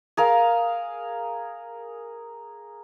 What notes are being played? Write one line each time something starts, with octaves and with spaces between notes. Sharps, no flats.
G#4 A#4 F5